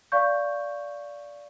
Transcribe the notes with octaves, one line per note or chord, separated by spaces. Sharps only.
D5 F5 C#6 G6